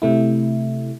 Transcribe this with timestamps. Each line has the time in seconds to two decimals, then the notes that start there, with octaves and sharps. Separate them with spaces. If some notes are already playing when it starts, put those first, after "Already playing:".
0.02 C3 A3 E4